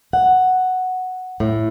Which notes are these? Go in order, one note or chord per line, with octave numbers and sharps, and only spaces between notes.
F#5
A2